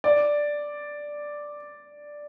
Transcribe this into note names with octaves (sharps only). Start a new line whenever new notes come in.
D5